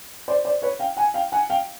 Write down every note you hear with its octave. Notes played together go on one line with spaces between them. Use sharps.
C5 D5
C5 D5
B4 C#5
F5 G5
F#5 G#5
F5 G5
F#5 G#5
F5 G5